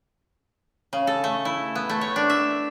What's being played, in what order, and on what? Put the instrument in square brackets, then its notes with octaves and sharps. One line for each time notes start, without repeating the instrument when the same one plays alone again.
[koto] C#3
A4
A3
E4
B3
A3
C#5
D4
E5